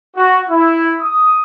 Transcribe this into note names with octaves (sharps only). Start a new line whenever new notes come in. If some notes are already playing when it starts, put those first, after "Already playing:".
F#4
E4
D#6